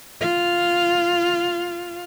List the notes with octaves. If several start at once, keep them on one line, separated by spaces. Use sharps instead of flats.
F4 F5